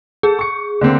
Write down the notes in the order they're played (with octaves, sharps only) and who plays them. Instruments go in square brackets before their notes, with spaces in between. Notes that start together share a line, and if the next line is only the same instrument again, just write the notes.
[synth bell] G#4 [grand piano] A4
[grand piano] C#6 C#7
D3 A#3 C4